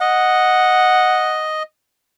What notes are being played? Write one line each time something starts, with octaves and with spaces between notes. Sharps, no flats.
D#5 F#5